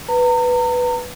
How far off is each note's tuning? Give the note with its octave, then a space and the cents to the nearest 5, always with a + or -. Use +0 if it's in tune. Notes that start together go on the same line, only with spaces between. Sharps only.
B4 +0 A#5 -35